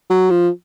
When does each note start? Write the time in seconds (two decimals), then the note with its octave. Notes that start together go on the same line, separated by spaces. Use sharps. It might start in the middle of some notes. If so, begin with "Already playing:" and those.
0.10 F#3
0.30 F3